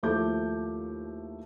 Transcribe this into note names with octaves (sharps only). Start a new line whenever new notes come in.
D#2 F3 A3 E4 D6 G6